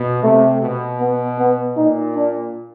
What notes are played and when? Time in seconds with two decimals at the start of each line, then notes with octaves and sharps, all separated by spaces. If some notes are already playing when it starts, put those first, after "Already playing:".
Already playing: B2
0.23 C3 A3
0.62 B2
1.00 B3
1.38 B3
1.76 A#2 D#4
2.15 D4